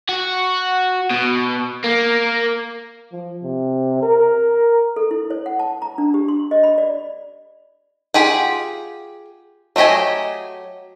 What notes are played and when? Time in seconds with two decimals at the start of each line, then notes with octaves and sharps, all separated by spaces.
0.09 F#4
1.10 B2
1.84 A#3
3.12 F3
3.43 C3
4.03 A#4
4.96 A4
5.11 E4
5.30 C#5
5.46 F#5
5.59 A5
5.82 A#5
5.98 D4
6.14 G4
6.28 C6
6.51 D#5
6.63 B5
6.78 D5
8.14 F4 G4 G#4 F#5
9.76 F#3 A3 G4 D#5 G#5